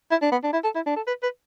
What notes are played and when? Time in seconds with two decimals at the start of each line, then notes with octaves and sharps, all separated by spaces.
0.11 E4
0.22 D4
0.32 B3
0.44 D4
0.53 E4
0.64 A4
0.75 E4
0.87 D4
0.96 A4
1.08 B4
1.23 B4